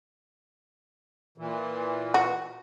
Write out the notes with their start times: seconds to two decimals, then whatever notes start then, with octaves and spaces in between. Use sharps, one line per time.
1.38 A#2 E3
2.14 F#4